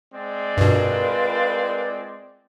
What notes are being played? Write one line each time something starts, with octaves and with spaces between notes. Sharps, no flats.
G#3 C4 D5
G2 B2 F4 A#4 B4